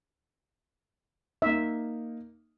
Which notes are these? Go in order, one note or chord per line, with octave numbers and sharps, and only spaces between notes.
A#3 D#4 E5